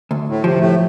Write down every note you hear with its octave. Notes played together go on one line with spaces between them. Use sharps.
D2
A2
C3 F3
A2 A3